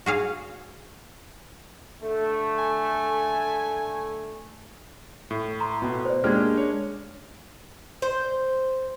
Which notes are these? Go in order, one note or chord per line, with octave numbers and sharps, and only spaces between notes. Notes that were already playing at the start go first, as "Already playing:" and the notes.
F#4 G#4 F5
D3 A3
G#5
A2
A#5 C6
B2
C5 D5
G#3 A#3 C#4 D4 G4 F6 G#6
C#5
C5